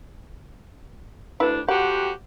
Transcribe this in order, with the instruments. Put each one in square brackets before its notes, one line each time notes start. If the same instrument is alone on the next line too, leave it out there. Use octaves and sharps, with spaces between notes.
[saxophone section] D2 D4 [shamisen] E4 B4
[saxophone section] F2 F#4 G4 [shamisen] F#5